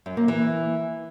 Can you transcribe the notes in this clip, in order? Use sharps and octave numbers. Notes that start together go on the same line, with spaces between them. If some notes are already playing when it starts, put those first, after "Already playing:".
F#2
A#3
E3